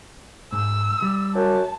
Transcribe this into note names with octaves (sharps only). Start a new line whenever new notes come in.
G#2 E6
G3
F#2 A5